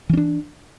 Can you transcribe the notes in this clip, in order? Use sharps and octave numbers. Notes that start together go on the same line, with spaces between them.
E3 C#4 D4